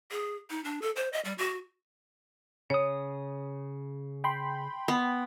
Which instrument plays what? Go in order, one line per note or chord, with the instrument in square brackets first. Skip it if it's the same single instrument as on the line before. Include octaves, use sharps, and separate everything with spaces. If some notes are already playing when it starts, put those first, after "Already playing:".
[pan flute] G#4
D#4
D4
A4
C5
D#5
G3
F#4
[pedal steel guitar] C#3 D#6 [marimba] C#5
[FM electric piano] G5 B5 C6
[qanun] B3